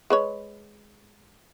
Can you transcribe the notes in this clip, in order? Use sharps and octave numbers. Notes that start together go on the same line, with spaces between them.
G#3 B4 C#5